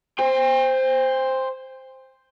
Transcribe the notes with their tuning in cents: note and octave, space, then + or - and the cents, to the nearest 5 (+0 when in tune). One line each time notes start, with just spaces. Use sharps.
C5 +0 G5 +40